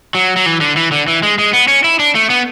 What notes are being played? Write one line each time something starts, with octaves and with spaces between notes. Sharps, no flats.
F#3
F#3
E3
D3
E3
D3
E3
G#3
G#3
B3
C#4
E4
D4
A3
B3